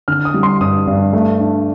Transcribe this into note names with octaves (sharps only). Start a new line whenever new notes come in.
D3 F6
D#6
G3
C6
G2 D#6
G2
A3
D4